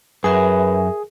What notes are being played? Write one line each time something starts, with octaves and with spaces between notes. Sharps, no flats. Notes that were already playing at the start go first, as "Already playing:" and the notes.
F#2 G#4 A#4 B4 E5 G#5